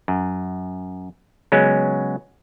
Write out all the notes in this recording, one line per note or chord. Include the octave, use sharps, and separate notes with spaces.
F#2
C#3 F#3 G#3 B3 C#4